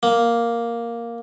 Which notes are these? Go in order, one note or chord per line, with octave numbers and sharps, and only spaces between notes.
A#3